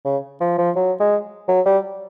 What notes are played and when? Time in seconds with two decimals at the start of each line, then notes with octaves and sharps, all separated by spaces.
0.05 C#3
0.41 F3
0.58 F3
0.76 F#3
1.00 G#3
1.48 F#3
1.66 G3